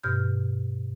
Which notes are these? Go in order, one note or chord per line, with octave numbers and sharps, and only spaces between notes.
G2 B2 F6 G6